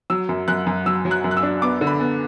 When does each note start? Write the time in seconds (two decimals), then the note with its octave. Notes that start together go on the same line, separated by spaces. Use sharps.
0.10 F#3 E6
0.29 F#2
0.48 F#2 F#6
0.67 F#2
0.86 F#3 E6
1.05 F#3
1.11 F#6
1.24 F#2
1.31 F#6
1.37 E6
1.43 D4
1.62 B3 D6
1.81 D3
1.87 B5
2.00 B3